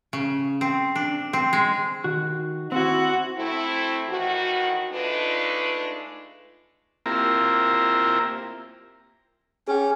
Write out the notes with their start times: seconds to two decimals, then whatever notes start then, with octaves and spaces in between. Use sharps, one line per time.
0.13 C#3
0.61 C4
0.96 D4
1.33 C4
1.53 G#3
2.04 D#3 F#4
2.72 C4 E4 F#4
3.36 A3 C4 E4
4.08 A2 D#3 E3 F#4
4.92 G#3 A3 D4 D#4 F4 B4
7.06 A#3 C4 E4 F4 G4 A#4
9.68 C#4 G#4 G5